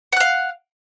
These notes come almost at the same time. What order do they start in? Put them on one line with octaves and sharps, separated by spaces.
F#5 F#6 F5